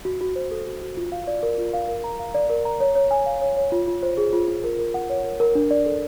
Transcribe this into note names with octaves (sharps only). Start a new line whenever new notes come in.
F#4
F#4
C5
A4
F#4
F#4
F4
F5
D5
A#4
F4
F5
A#4
A#5
F5
D5
A#4
A#5
C#5
C#5
G#5
F5
C#5
C#5
F4
F4
C5
G#4
F4
F4
A#4
A#4
F#5
C#5
A#4
A#4
D4
D5
A4